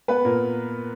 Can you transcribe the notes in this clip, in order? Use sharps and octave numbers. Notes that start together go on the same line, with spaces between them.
B3 B4
A#2 A#4